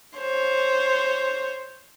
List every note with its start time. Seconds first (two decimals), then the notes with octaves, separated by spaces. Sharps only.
0.18 C5 C#5